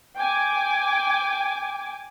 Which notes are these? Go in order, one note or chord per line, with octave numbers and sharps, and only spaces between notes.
G5 G#5 D6